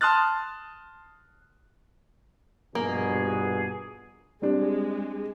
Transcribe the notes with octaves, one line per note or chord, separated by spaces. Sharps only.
A5 C6 D#6 F6 F#6 A6
A#1 G2 B2 A#3 G#4
G3 G#3 C4 D4